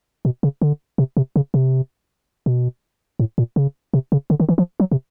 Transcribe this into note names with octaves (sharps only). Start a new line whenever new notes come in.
B2
C#3
D3
C3
C3
C#3
C3
B2
A2
A#2
C#3
C3
C#3
D3
D#3
E3
F3
F#3
C3